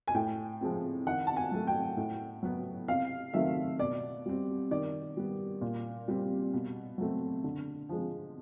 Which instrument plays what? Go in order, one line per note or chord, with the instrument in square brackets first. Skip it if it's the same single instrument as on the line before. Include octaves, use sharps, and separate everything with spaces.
[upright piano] G#5
A2 G5
F3 G#3 C4
D#3 F#5
A5
G#5
F#3 A3
G5
A2
F#3 B3
C3 F5
D#3 F#3 A3 C4 E5
B2 D5
G3 C4
D#3 D5
G3 B3
A#2
G3 C4
B2
F#3 A3 C4
D3
F3 G#3